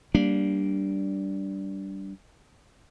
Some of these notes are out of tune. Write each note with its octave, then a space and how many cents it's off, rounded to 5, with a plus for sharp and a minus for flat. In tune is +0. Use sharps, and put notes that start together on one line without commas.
G3 -15 A#3 +0 D4 -15